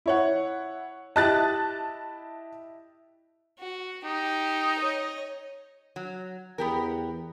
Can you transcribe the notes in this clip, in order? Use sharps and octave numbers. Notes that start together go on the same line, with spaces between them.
E4 C#5 F#5
E4 G4 D#5 A5 F#6 A6
F#4
D#4 G4
C#5 D#5
F#3
E2 B3 G4 A#4